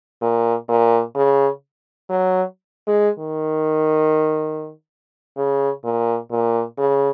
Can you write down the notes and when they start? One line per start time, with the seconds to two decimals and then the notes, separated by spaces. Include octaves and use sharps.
0.21 A#2
0.68 A#2
1.15 C#3
2.09 F#3
2.87 G#3
3.18 D#3
5.37 C#3
5.84 A#2
6.31 A#2
6.78 C#3